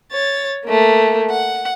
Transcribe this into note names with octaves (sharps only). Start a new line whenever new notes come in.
C#5 A6
A3 A#3
F#5